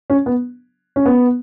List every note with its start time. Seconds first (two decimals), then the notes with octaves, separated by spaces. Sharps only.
0.10 C#4
0.26 B3
0.96 C#4
1.06 B3